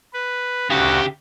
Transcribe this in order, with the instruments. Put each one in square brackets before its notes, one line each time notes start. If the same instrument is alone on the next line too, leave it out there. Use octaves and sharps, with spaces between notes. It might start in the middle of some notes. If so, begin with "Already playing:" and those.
[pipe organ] B4
[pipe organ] D2 F#4 [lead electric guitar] C#3 G4